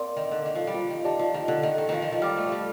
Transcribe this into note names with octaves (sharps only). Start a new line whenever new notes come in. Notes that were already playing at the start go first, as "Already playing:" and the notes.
Already playing: A#3 C4 A#4 D5 F5 C6
D#3
D3
D#3
F3
G3
F3
D#3
D#3 G4 D5 A5
F3
D#3
D3
D#3
D#3
D#3 F3
D#3
F3
G3 D5 G5 D6 F6
A3
F3
G3